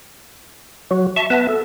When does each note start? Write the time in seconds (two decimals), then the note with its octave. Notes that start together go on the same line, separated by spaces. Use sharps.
0.91 F#3 F#4
1.16 E5 A5 C#6
1.30 B3 B4 E5 A5
1.49 A4